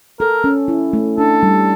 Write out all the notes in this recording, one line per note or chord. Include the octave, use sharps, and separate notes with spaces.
A4 A#4
C#4
E4
A3
D4 A4
G3